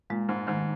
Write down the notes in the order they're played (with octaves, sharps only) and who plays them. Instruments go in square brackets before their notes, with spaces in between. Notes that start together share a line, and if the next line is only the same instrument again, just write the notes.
[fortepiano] A#2 [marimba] G#3
[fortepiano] G#2
[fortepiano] G#2 [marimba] D#3